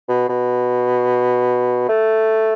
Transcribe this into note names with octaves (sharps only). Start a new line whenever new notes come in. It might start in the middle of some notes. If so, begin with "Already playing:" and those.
B2
B2
A3